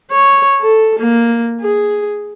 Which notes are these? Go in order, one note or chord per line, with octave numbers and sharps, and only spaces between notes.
C#5
A4
A#3
G#4